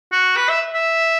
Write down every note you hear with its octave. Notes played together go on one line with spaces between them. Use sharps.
F#4
B4
E5
E5